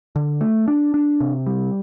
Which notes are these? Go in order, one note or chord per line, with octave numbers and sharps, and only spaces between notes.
D3
A3
D4
D4
C3
G3